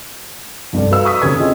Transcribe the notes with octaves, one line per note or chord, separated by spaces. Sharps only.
C2 G2 G3 A4
F#4 A4 B4 F5 E6
C#6 D#6 B6
D#2 C3 C#4 A4 B4 G#6
C4 C#4 E4 F4 G#4 D#5